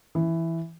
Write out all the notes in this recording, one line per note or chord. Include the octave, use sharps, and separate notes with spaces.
E3